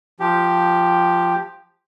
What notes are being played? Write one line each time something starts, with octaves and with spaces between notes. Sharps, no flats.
F3 G4